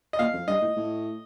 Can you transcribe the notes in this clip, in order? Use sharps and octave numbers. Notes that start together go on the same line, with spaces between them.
D#5
A#2 F5
F2
G2 D#5
A2
A2